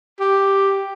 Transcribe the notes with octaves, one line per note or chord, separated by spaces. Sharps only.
G4